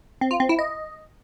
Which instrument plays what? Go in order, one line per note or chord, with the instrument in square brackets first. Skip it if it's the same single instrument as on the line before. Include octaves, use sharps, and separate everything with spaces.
[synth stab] C4
F4
C4
E4
D#5